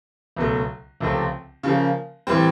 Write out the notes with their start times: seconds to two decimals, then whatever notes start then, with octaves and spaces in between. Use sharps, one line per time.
0.36 C#2 B2 F#3 A3
1.00 C#2 C3 F3 A3 C4
1.63 C#3 F3 A#3
2.27 A2 E3 G3 C4